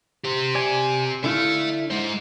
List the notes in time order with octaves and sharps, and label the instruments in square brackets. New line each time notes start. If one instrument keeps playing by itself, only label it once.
[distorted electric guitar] G4 C5
[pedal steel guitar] D5 G#5
[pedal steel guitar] D3 E4 F5 [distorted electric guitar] E5 A5
[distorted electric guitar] G#3 C5